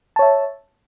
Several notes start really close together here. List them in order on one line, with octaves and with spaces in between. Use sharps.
A5 C#5 E5